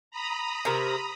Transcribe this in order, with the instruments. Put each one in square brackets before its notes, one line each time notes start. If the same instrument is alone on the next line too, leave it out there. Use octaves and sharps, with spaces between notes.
[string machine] A#5 B5 D#6
[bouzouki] C3 A#4